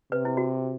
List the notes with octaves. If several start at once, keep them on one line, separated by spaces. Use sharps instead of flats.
C3 B4
E4
F#4